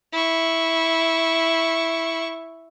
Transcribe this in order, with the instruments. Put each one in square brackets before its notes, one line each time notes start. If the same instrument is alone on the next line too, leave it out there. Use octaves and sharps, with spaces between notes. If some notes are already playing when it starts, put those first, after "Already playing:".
[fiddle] E4 C#6